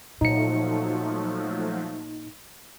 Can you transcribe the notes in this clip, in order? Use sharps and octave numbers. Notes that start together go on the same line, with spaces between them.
A#2 F3 F#3 A3 D#4 C#7